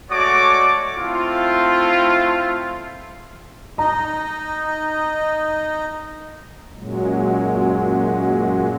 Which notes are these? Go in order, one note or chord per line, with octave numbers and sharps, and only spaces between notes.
G#3 A3 F#4 C#5 D5 D6
A3 C4 E4 F4
D#4 D#5 A#5
F#2 A#2 F#3 G#3